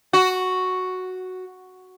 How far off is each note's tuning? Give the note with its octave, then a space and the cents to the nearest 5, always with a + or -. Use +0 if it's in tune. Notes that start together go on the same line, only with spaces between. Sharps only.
F#4 +0